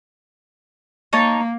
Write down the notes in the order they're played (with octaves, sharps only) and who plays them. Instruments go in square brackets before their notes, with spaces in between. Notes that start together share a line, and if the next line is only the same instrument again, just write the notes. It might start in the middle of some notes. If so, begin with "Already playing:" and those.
[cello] A#3 [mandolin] D#4 C#5 A5